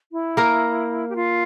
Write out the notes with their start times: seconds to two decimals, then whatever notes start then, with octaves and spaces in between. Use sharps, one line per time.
0.11 E4
0.37 A#3 A#4
1.09 G4
1.15 F4